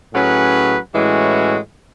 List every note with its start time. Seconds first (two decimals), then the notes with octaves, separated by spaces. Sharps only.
0.13 A2 F#3 C#4 G#4 B4
0.94 A2 E3 G#3 C#4 F#4